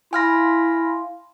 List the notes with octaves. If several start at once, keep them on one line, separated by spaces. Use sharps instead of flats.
E4 F5 G#5 B5 C6 F6 A#6